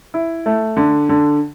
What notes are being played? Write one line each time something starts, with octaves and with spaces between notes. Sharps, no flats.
E4
A3
D3
D3